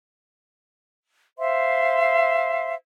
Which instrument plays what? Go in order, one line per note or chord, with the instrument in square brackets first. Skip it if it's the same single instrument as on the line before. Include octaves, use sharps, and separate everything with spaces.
[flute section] C5 E5 F5 C6